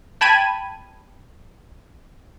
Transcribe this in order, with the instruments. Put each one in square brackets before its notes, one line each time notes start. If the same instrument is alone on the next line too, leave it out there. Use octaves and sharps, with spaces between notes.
[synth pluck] G5 A5 B5 G#6 D#7